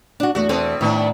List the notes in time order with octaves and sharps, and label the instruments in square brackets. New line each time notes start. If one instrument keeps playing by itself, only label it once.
[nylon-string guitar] D4 F#4
[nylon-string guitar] E2 A3 [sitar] F#4
[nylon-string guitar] E2 A4 [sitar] B2 C4
[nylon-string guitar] A2 [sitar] D#3 B3 D4